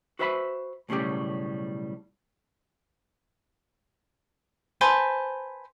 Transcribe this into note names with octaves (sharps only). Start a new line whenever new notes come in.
F#4 B4 C5 E5 A5 B5
B1 A2 C#3 G3 G4
B4 C5 G#5 A5